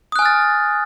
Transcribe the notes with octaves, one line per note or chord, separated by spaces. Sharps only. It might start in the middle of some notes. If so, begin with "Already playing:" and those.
G#5 D#6 F6 F#6 A6